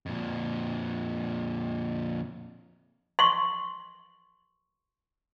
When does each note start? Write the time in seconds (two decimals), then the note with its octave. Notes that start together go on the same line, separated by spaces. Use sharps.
0.06 F2 A#2
3.19 C6 C#6